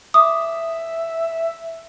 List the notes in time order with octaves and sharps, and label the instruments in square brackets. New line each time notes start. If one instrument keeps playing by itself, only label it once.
[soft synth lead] E5 [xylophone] D6 D#6